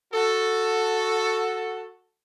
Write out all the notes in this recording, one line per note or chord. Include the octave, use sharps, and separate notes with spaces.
F#4 A4